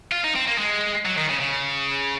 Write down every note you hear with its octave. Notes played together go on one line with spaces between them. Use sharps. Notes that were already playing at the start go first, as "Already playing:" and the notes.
F4
D#4
C4
A#3
G#3
F#3
D#3
C#3
C#3